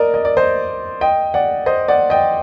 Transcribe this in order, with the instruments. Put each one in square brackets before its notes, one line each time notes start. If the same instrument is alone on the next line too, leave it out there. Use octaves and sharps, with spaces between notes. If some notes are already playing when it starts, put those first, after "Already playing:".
Already playing: [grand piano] A#4 D5 D#5
D#5
D5
C5 D#5
D#5 G5
D5 F#5
C5 D#5
D5 F#5
D#5 G5